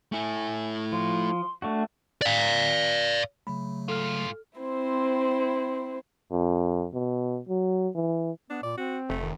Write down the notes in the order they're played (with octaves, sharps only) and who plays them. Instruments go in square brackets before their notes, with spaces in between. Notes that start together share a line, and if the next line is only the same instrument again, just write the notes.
[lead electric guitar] A3 E4 [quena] G#5
[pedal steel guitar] F3 [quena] C6
[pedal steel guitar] A3 D4 F#4 [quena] C#6
[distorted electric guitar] D5 F5
[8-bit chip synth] C#3 F#3 A3 [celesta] B5
[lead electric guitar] G#2 F4 [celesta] A4 F6
[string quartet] C4 E4 C5
[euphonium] F2
B2
F#3
E3
[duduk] B3 [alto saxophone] D4
[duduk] A#2 [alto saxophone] D5
[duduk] C4 [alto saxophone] F#4
[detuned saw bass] F1 [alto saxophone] A3
[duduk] D#3